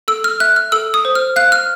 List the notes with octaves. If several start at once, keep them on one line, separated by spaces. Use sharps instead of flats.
A4 E6
F6
E5 F#6
F6
A4 E6
D#6
C5
F6
F5 F#6
F6